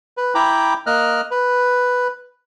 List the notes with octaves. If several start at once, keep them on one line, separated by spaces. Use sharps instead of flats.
B4
E4 G5 A#5 B5 D6
A#3 D#5 F6 F#6
B4